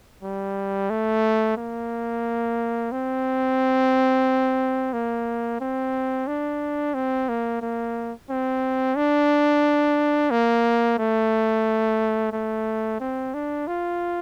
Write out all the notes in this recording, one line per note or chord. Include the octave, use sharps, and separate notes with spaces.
G3
A3
A#3
C4
A#3
C4
D4
C4
A#3
A#3
C4
D4
A#3
A3
A3
C4
D4
F4